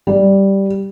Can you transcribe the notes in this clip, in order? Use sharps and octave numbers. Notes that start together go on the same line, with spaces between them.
G3